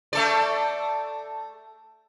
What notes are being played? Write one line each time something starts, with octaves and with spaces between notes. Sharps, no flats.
A3 A4 D5